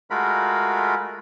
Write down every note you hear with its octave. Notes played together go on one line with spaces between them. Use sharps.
G#3 A3 F4 F#4 A#4 B5